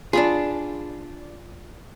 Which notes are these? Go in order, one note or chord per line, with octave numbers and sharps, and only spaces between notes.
D4 F4 G#4 B5